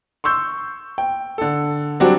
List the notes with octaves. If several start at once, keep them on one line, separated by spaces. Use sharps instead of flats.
C6 C#6 E6 G6
G5
D3 A4
F#3 G3 C4 D4 F#4 G4